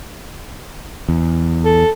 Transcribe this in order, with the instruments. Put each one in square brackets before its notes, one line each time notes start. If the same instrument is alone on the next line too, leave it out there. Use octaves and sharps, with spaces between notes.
[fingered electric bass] E2
[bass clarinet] A4